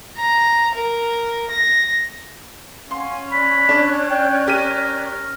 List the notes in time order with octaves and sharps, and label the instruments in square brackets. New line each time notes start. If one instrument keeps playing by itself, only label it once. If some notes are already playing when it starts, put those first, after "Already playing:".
[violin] A#5
A#4
A#6
[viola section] C#4 [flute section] F5 F#5 G#5 [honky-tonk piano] C6
[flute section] C#5 D5 F#6 [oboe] B5
[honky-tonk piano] D4
[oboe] G5
[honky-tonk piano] G4 D#7 [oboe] A#4